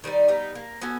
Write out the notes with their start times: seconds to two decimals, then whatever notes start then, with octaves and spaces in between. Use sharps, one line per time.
0.04 D#3 G3 D#4 D5
0.28 G3 B3 D#4
0.55 A#3
0.81 B3 C#4 F#4 A4